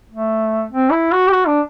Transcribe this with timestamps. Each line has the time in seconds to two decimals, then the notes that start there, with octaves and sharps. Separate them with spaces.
0.11 A3
0.72 C4
0.92 E4
1.12 F#4
1.27 G4
1.32 F#4
1.47 D4